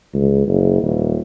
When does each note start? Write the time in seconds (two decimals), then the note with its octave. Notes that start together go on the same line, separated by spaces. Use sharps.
0.13 C#2
0.47 F#1
0.81 D#1